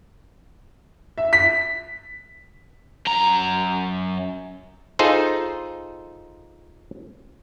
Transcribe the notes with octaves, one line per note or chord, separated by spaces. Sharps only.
E5
B6
F#2 A#5
D#4 F4 G#4 A4 C5